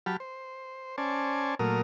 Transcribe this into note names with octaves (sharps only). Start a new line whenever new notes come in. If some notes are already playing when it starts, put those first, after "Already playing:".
F#3 G4 A5 B5 F6
C5
C#4 C5 D5 G#5 A5
A#2 F#3 A3 A#4 D#6 F6